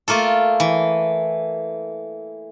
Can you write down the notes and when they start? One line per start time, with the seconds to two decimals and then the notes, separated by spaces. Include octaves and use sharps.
0.08 A3 A#3 F4 A4
0.60 E3